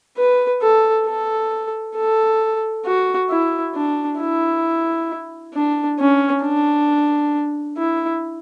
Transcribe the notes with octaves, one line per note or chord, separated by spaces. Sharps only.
B4
A4
A4
A4
F#4
E4
D4
E4
D4
C#4
D4
E4